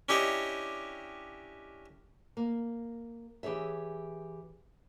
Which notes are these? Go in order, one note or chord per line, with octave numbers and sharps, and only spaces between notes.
C#4 D4 E4 G4 C#5 D#5
A#3
E3 G4 G#4 C#5 E5